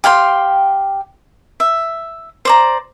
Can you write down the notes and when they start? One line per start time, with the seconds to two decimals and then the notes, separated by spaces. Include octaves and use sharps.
0.04 G4 F5 G5 C6
1.60 E5
2.45 C5 D5 A#5